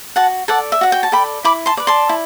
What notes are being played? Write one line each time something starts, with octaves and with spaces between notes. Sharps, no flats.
F#4 F#5 A5
A4 D5 F#5 A5
E5
F#4 F#5
G5
A5
A4 D5 G5 B5
E4 B5 D6
A5 C6
B4 D5
A5 C6
E4